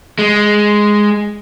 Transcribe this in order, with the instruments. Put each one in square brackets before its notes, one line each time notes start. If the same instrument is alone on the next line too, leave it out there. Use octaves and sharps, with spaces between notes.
[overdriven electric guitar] G#3